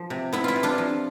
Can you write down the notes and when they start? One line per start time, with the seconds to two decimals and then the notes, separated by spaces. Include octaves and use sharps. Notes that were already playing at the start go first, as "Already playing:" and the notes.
Already playing: F3
0.10 C3
0.33 B3 E4
0.44 E4 F4
0.56 C3
0.63 D4 F4
0.78 F3